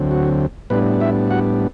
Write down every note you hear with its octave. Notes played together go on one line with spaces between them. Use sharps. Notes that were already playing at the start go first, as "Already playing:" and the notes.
Already playing: D2 D3 F#3 C4
F#4
A2 G3 B3 D4 B4
E4 E5
F#4 F#5